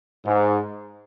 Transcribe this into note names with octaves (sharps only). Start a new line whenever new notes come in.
G#2